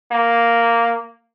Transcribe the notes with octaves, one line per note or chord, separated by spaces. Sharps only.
A#3